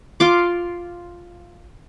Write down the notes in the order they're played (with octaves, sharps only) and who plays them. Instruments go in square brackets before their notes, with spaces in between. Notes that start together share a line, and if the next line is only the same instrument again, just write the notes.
[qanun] F4 D6